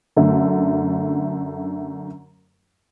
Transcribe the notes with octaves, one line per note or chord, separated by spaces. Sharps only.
F#2 D3 A3